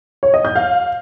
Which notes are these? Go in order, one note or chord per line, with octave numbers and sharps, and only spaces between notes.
C#5
D#5
G6
F5